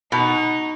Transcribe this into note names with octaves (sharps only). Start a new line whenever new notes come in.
B2 D#4